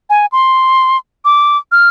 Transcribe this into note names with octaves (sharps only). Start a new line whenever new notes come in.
G#5
C6
D6
F6